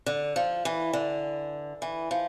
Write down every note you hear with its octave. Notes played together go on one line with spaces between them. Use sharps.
D3
F3
E3
D3
E3
F3